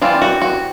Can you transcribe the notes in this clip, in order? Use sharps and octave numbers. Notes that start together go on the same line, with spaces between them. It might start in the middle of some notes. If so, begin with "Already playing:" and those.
E3 G3 C4 F4
F#4
F#4